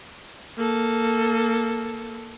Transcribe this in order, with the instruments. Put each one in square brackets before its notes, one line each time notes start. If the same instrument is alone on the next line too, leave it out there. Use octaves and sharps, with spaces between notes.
[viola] A#3 A4